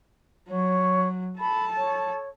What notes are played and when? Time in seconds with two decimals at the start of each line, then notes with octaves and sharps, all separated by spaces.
0.49 F#3 C#5
1.39 A4 A5 B5
1.77 C#5